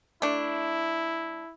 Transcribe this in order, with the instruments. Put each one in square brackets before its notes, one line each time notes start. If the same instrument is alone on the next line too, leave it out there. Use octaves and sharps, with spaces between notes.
[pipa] A3 D4 [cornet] E4